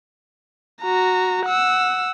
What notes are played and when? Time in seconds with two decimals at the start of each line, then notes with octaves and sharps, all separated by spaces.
0.82 F#4 A#5
1.46 F#5 E6